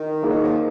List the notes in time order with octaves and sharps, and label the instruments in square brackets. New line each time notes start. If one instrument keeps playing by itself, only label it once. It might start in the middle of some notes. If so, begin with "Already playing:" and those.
Already playing: [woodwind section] D#3
[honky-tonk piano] A#3 D#4 G#4
[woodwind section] F#3
F3